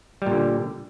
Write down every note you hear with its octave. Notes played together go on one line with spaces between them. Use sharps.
A#2 D3 G3